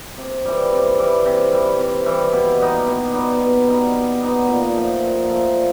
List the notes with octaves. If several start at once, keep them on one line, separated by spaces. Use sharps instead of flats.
C3
E3 G3
C3
E3 G3
C3
E3 G3
C3
E3 G3
B2
G3 B3 D#4
B2
G3 B3 D#4
B2
G3 B3 D#4
B2
G3 B3 D#4
A#2
F3 A3
A#2
F3 A3
A#2